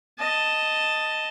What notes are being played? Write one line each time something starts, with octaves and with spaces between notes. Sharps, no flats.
D#5 A5